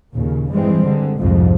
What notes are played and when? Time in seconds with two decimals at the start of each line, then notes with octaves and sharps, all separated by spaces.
0.14 D#2 A#2 C#3
0.53 G2 E3 G3 G#3 C4
0.85 D3 G#3
1.20 C2 F2 G#2 F3